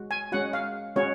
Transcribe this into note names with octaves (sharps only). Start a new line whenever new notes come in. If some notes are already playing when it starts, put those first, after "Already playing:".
Already playing: G#3 F#4
G#5
G#3 C#4 F#4 F#5
F5
G#3 C#4 F#4 C#5